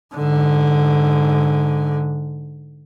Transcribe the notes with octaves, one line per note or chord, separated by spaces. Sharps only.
G#2 D3